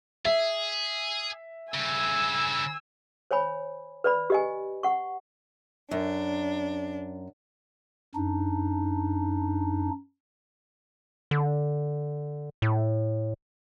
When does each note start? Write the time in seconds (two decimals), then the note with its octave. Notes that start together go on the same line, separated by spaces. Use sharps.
0.25 G#4 E5
1.74 G2 C#3 G#5 E6
3.31 C5 C#5 G#5 B5
4.04 B4 D5 B5
4.30 G4 D#5 G#5
4.83 F#5 C#6
5.91 F#2 D4
8.15 F#2 D4 D#4
11.31 D3
12.62 A2